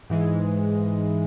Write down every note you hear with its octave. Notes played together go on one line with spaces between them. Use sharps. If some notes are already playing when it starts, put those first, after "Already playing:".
G#2 E3 G#3